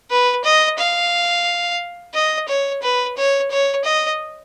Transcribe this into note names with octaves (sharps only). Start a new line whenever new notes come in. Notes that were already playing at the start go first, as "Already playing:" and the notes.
B4
D#5
F5
D#5
C#5
B4
C#5
C#5
D#5